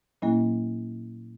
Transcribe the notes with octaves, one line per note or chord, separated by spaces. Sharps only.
A#2 F#3 A#3 C#4 E4